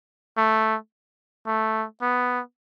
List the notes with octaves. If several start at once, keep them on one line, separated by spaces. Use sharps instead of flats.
A3
A3
B3